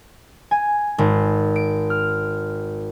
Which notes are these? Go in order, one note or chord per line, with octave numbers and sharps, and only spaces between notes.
G#5
G#1
D7
F6